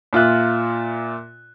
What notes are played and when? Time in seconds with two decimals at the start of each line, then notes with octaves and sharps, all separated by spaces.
0.13 A#2 F4 E5 F#6